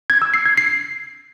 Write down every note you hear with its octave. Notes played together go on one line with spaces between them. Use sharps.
G#6
E6
C7
G#6
C7